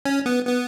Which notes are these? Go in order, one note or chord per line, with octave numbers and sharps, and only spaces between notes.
C#4
B3
B3